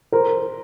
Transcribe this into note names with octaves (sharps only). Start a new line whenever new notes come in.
A#4 C5